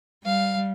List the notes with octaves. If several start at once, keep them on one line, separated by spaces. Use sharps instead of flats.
G3 F5